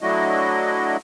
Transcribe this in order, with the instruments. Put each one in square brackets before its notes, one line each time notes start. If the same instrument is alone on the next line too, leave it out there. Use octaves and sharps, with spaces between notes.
[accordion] F#3 A3 D4 E4 F#4 D#5